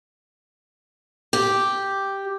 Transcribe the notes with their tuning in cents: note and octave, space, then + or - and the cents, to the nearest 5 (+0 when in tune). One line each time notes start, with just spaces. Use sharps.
G4 +0